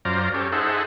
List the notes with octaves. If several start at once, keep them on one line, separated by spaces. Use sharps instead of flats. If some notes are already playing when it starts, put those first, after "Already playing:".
F#2 F4 C5 D5 A#5
C#4 G4 A4
D#4 G#4 A4 C5 E5 F#5